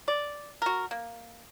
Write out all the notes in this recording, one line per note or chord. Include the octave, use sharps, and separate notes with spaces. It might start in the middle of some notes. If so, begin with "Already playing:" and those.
D5
F#4 A#4
A#3